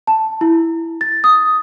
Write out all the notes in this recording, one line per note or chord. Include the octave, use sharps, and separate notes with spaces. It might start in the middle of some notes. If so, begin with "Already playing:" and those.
A5
E4
A6
D#6